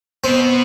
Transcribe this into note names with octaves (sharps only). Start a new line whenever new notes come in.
B2 C4